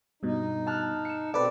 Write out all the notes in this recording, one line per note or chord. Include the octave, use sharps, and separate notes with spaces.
G2 B2 D#4
A5 F6 F#6
C#7 E7
B2 C4 A4 B4 D5